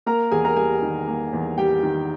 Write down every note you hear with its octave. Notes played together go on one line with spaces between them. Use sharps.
A#3 A#4 A#5
E2 G#4 G#5
A#4 A#5
G3 G#4 G#5
D#3
A#3
E2
G3 G4 G5
D#3